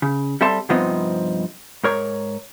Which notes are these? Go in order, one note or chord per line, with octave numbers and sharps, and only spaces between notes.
C#3
G3 C4 A4 E5 A5 C6
G2 C3 F3 B3 C4 D#4
G#2 A#4 C#5